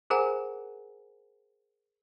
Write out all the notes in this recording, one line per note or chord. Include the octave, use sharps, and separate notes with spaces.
G#4 A#4 C5 F#5 G#5 A#5